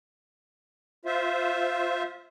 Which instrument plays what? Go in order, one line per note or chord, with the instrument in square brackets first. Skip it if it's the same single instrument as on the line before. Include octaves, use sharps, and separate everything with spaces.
[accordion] F4 C5 E5